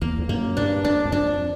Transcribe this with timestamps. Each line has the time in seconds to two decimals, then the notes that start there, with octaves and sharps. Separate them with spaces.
0.02 E2 A#3
0.19 E2
0.29 F#2 A#3
0.57 G2 D4
0.84 F2 D4
1.05 E2
1.12 F2 D4